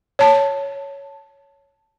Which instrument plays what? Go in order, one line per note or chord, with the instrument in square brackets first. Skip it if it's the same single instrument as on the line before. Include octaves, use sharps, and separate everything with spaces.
[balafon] C#5 A5